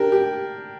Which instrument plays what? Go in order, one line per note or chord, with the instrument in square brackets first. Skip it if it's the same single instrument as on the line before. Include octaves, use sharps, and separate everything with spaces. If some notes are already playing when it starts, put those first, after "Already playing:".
Already playing: [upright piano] D4 G4 A#4
G4